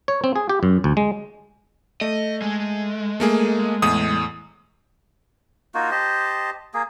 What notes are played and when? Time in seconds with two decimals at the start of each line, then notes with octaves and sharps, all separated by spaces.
0.08 C#5
0.24 C4
0.36 G#4
0.49 G4
0.63 F#2
0.84 D2
0.97 G#3
2.01 A3 D#5
2.42 G#3
3.20 A3 A#3 G#4
3.82 E2 A2 D#6
5.74 A#3 D#4 F4 F#4
5.91 G4 C5 D#5 A5
6.74 A#3 G#4